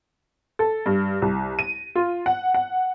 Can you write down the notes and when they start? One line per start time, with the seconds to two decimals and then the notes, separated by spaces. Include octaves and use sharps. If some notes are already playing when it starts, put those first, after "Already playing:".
0.59 A4
0.86 G2
1.22 C2
1.59 D#7
1.96 F4
2.26 F#5
2.54 F#5